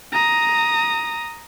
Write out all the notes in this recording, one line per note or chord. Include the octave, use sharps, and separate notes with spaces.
A#5 D#6